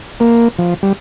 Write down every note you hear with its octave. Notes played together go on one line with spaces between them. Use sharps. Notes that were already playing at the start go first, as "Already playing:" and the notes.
A#3
F3
G3